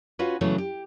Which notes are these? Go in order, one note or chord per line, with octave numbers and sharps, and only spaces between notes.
C#4 F4 F#4 B4
C#3 E3 F#3 A3 B3
G4